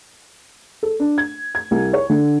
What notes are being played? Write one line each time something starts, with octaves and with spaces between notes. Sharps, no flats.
A4
D4
G#6
G#6
C2
C#5
D3